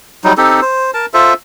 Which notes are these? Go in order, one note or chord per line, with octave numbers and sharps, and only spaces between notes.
F#3 G3 D#4
C4 D#4 G4 A4
C5
A#4 A5
F4 A4 C5 E5